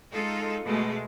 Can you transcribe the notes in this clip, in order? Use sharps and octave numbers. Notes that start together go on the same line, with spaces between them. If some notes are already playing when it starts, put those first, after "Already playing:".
G#3 D#4 F4 A4
B2 G#3 A3